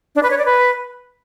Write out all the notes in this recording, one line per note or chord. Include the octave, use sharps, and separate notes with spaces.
D4
B4
C#5
D5
B4